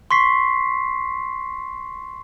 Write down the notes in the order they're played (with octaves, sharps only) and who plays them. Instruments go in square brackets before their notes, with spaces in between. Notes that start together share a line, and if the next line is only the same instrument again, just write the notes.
[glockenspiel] C6 C#6 B6 C7